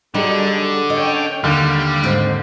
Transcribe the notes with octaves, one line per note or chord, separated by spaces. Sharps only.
D3 F#3 G3 D#4 G#4 A4
C#4 C#5 D#5 G5
D#2 D3 G3 F5
G#2 C4